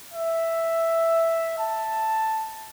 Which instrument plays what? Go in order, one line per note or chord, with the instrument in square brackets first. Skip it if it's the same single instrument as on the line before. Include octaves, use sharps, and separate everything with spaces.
[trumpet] E5
A5